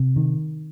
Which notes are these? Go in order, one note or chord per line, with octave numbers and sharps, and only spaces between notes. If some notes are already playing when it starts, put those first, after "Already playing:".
Already playing: C3
D#3